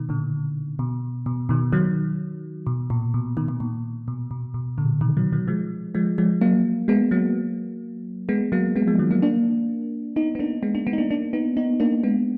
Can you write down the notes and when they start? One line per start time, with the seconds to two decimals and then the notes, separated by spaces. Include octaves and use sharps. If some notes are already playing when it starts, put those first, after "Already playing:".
Already playing: B2 D#3
0.09 A#2 D3
0.79 B2
1.26 B2
1.49 B2 D#3
1.73 D#3 F#3
2.67 B2
2.90 A#2
3.14 B2
3.37 B2 D#3
3.48 B2
3.60 A#2
4.08 B2
4.31 B2
4.54 B2
4.78 A#2 D3
5.01 B2 D#3
5.17 D#3 F#3
5.33 D#3 F#3
5.48 F3 G#3
5.95 F3 G#3
6.18 F3 G#3
6.41 F#3 A#3
6.88 G#3 B3
7.11 F#3 A#3
8.29 G#3 B3
8.52 F#3 A#3
8.76 G#3 B3
8.88 F3 G#3
8.99 D#3 F#3
9.11 F#3 A#3
9.22 A#3 D4
10.16 B3 D#4
10.35 B3
10.39 A#3 D4
10.63 G#3 B3
10.75 A#3 D4
10.87 G#3 B3
10.93 D#4
10.98 A#3 D4
11.10 A#3 D4
11.33 B3 D#4
11.57 B3 D#4
11.80 A#3 D4
12.03 G#3 B3